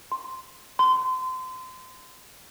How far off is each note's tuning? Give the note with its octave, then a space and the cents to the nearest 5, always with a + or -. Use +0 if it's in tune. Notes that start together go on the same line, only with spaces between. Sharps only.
C6 +0
C6 -30